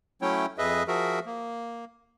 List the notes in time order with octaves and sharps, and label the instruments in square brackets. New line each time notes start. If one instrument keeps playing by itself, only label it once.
[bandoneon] F#3 A3 C#4 E4 C#5 G5
F2 G#4 B4 D#5 E5
F3 F#4 G#4 A#4 E5
A#3